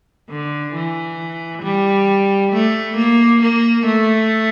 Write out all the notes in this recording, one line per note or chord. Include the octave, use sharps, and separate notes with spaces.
D3
E3
G3
A3
A#3
A#3
A3